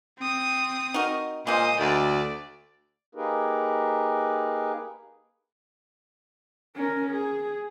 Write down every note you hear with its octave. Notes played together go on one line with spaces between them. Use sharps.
C4 D#6
D#4 F#4 A#4
A#2 G3 G#3 A#3 C5 D#6
D2 D5
A#3 D#4 G4 G#4 A#4 B4
C#4 A#4
G#4